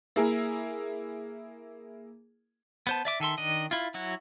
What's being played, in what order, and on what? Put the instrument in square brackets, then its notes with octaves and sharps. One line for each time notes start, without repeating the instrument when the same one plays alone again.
[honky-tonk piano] A#3 E4 G#4 A#4
[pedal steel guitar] B3 C5 A5
D5 E5 D6
D#3 A4 E5 C6
D#3 D4 D#5
E4 F4
F#3 E4 F#4